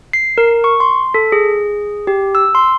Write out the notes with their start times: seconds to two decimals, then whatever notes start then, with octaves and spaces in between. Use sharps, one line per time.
0.13 C7
0.38 A#4
0.64 C#6
0.80 C6
1.14 A4
1.32 G#4
2.07 G4
2.35 E6
2.55 C6